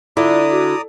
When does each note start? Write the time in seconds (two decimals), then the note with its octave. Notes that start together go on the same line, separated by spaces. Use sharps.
0.17 D3 E4 F4 D5 A#5 D#6
0.51 F#4